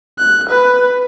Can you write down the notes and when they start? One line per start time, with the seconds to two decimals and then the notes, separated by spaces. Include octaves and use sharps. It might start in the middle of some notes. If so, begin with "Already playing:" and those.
0.18 F#6
0.50 B4